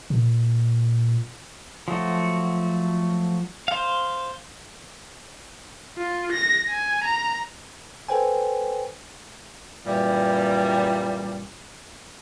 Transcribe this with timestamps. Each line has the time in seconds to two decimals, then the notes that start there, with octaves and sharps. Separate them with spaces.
0.10 A#2
1.88 F3 F#3 A3 F#4
3.68 C5 F5
5.97 F4
6.33 A#6
6.69 G#5
7.04 A#5
8.09 A4 B4 C5 G5 G#5
9.86 F#2 A#2 E3 G3